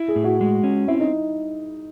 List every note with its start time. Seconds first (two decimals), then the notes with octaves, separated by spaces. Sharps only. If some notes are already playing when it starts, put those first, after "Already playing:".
Already playing: E4
0.08 G#4
0.16 A2
0.24 F#4
0.41 G#3
0.64 C#4
0.88 C4 E4
1.00 D#4